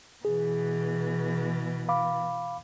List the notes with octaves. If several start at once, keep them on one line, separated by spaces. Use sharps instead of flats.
B2 E3 G#4
F5 B5 D6